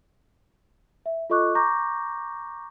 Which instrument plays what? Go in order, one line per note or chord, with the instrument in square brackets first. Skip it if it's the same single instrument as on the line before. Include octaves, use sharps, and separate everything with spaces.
[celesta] E5
F4 A4 D#5 C#6 D6 F#6
A#5 C#6 D6 G6 A#6